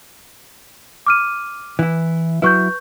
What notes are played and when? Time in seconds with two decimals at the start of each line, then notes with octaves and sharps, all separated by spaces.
1.06 D6 F6 D#7
1.79 E3 E4
2.42 F#3 E4 B4 C#6 G6